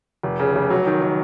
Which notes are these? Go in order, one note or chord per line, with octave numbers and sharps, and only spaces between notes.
F1
C#3
F1
F#3
D#3
D#3